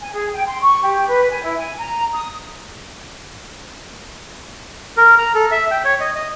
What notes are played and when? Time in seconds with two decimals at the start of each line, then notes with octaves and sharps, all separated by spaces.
0.01 G#5
0.13 G#4
0.34 G5
0.46 C6
0.60 C#6
0.81 G4
1.08 B4
1.29 G#5
1.43 E4
1.58 G#5
1.78 A#5
2.13 D#6
4.97 A#4
5.18 A#5
5.35 A4
5.52 E5
5.71 G5
5.84 C#5
6.00 D#5
6.15 D#5